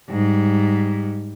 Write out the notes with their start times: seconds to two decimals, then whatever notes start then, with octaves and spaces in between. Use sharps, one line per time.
0.10 G#2 G3